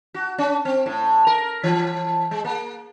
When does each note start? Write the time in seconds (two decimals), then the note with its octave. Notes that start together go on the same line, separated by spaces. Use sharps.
0.14 F#4
0.38 C#4
0.65 C4
0.86 A2
1.27 A#4
1.64 E3
2.31 G#3
2.45 A#3